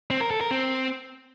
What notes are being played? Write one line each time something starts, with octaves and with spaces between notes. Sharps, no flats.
C4
A#4
A4
A#4
C4